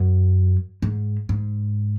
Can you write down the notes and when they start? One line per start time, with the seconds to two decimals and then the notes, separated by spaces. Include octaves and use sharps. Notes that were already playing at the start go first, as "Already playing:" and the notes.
Already playing: F#2
0.82 G#2
1.29 G#2